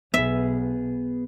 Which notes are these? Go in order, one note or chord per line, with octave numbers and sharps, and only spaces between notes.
B1 B3 G#4 E5